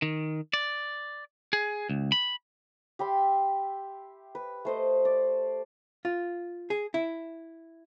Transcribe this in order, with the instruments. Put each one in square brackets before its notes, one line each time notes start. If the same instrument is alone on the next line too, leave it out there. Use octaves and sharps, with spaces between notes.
[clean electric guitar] D#3
D5
G#4
C#2
B5
[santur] G4 E5 B5 C6
B4
A3 C5 D#5
D5
[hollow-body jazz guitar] F4
G#4
E4